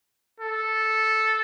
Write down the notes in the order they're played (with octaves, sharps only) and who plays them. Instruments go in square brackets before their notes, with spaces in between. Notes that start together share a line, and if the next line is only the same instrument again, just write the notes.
[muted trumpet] A4